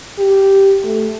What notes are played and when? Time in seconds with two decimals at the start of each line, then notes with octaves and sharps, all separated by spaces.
0.18 G4
0.84 A3